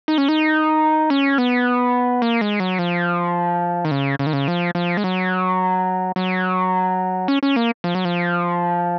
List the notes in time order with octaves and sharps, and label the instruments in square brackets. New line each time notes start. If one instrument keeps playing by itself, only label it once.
[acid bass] D#4
C#4
D#4
C#4
B3
A#3
G#3
F#3
F3
D#3
C#3
C#3
D#3
C#3
F3
F3
G#3
F#3
F#3
C#4
C#4
A#3
F3
F#3
F3